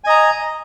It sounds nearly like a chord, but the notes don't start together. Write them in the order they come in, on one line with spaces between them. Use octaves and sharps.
G#5 D#5 A#5